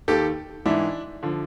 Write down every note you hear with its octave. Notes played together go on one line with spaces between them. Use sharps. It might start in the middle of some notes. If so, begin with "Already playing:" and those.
D#2 D#3 G4 A4
G#2 E3 D4 E4
D3 F3